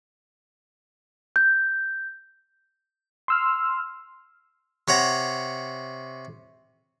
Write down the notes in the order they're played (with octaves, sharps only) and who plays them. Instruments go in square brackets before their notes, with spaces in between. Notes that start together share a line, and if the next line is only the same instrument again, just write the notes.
[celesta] G6
[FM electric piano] C6 E6 F6
[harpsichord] C3 C#5 F#5 A#5